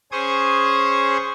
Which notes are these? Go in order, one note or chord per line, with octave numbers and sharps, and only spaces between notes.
C#4 G#4 C5 C#6 D#6 G#6